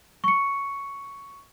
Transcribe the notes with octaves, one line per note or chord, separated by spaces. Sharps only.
C#6 C#7